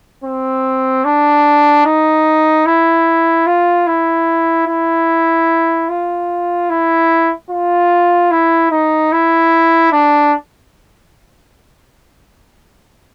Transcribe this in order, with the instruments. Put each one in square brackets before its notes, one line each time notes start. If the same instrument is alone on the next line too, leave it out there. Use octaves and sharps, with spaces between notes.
[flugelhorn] C4
D4
D#4
E4
F4
E4
E4
F4
E4
F4
E4
D#4
E4
D4